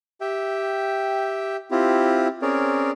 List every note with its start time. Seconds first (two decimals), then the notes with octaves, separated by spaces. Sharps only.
0.21 G4 E5 G5
1.71 C4 E4 F4 G4
2.42 C4 C#4 G#4 A#4 C#5 D5